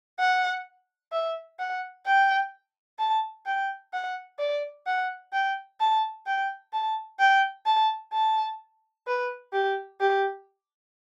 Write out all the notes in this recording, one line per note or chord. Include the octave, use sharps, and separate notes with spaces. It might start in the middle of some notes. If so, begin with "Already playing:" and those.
F#5
E5
F#5
G5
A5
G5
F#5
D5
F#5
G5
A5
G5
A5
G5
A5
A5
B4
G4
G4